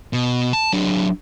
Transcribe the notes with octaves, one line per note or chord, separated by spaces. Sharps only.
B2
A5
F#3 D4